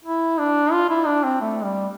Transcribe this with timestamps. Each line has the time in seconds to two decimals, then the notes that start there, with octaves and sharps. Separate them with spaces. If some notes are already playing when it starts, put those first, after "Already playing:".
0.05 E4
0.38 D4
0.73 F4
0.89 E4
1.06 D4
1.24 C4
1.41 A3
1.63 G3